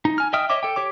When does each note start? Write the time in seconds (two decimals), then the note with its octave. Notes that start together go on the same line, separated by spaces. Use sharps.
0.05 D#4
0.18 G#5 F6
0.33 D#5 E5 G5 D#6 F6
0.50 C#5 D#5 E5 D6
0.63 A4 G5
0.76 G4 C#5 D6